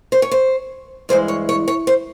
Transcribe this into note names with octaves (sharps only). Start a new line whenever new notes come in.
C5
C#5
C5
G2 E3 G#3 C5
C#5
C#5
C#5
C5